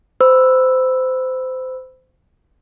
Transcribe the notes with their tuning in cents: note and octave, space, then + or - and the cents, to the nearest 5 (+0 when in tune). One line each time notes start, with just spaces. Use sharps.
C5 -25 B5 +0 E6 +0